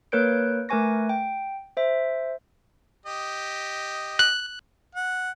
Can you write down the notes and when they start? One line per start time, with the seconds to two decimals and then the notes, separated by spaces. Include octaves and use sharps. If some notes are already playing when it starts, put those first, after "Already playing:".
0.12 A#3 A#4 B4 C#5 G6 D7
0.69 A3 A#4 B4 G#5 C#6 A#6
1.09 G5
1.77 C5 E5
3.06 G4 D#5
4.19 F#6
4.95 F#5